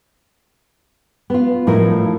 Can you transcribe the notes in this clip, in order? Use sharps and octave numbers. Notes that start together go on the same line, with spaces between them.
B3 F4
A2 F3 D#4 E4 A#4